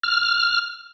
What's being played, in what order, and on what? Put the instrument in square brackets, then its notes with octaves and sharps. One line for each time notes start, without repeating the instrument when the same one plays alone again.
[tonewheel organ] F6